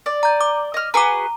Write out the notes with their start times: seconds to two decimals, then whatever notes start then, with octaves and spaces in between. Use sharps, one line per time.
0.06 D5
0.23 A#5 G6
0.41 D6
0.74 D#5 F6
0.94 F#4 G#4 B4 A#5 D6